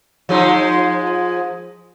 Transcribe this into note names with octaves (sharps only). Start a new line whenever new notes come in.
F3 G#3 D#4